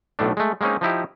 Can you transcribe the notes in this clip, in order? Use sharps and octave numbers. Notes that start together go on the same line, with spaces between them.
B1 A2 A3 D4
G#3 A3
G#3 A#3 C4 C#4 D#4
F3 D#4 E4 G4